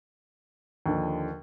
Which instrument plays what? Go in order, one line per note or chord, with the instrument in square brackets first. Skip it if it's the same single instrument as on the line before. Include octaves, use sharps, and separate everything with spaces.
[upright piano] D#2 D3 F3